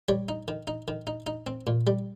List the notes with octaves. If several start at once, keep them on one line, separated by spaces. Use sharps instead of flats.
G3 C#5
D#4
D#3
D#4
D#3
D#4
D#4
C4
A#2
G3